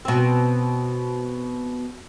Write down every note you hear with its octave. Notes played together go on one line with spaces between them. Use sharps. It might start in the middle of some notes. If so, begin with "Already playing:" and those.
B2 C4